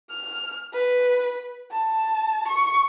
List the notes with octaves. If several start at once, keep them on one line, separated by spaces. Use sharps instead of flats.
F6
B4
A5
C#6